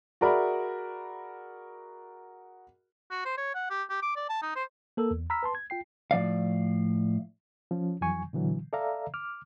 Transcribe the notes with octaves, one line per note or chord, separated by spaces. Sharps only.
F#4 G#4 A#4 D5 E5 B5
F#4
C5
C#5
F#5
G4
G4
D6
D5
A5
D#4
C5
A#3 A4 A#4 E6
E2
A#5 B5 E6 F6 B6
B4 A5 C6
G#6
F4 G5 C7
A2 F3 D5 F5
F3 C#4
F2 E3 F#3 G#5 C#6
A#2 D3 E3 F#3
A4 D5 E5 F5 A#5
D6 F6